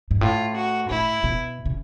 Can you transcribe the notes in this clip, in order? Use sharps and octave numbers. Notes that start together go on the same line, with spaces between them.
G#2
A2 F4
F#4
A2 E4
B2
C#3